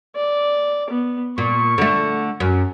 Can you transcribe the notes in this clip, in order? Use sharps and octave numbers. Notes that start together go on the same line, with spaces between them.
D5
B3
A#2 C#6
D3 A3
F#2